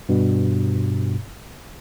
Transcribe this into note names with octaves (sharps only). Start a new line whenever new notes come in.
G2 B2